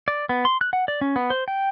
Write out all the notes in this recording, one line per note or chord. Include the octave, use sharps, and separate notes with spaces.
D5
B3
C6
F#6
F#5
D5
C#4
B3
C5
G5